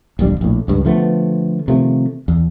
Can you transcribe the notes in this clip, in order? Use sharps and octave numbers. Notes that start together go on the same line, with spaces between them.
D1 A#1 G3 D4
A#1 A2
C#2 G2
D3 F3 A3 B3
C3 D#3 F3 A3
E2